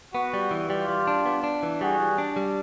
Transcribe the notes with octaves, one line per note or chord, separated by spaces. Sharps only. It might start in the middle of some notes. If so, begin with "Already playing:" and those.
B3 F#4
G3
E3
G3 F4 G4
G3
D4
B3
D4
E3
G3 F#4 G#4
G3
D4
G3